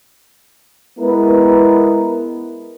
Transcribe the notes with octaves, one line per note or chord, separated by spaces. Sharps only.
G#3 B3 E4 A#4 B4